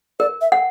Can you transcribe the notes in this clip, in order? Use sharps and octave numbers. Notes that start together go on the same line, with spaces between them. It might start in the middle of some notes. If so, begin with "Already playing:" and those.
A#4 D5
E5
F#5